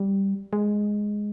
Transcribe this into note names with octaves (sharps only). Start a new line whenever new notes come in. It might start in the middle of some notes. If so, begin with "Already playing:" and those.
Already playing: G3
G#3